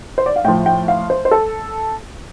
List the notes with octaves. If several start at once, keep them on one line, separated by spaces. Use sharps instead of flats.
C5
D5
F5
A2 F3 G5
G5
F5
C5
C5
A4